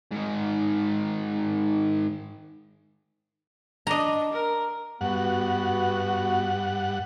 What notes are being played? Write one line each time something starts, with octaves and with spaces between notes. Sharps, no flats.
G#2 D#3
D4 D#5 A#5
A#4
G2 B3 F#4 F#5